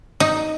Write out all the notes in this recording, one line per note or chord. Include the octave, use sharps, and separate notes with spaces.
D#4